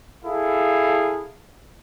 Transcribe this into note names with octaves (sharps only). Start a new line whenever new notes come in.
E4 G#4 A4 F5